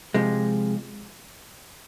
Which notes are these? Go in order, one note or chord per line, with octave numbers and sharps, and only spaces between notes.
C3 F3 G#3